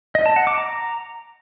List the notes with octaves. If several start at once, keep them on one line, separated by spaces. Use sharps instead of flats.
D#5
A5
F#5
D6
A#5